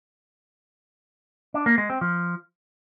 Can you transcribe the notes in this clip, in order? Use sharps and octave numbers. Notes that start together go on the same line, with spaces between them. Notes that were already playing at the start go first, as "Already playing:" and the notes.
D4
A#3
G#3
C4
F3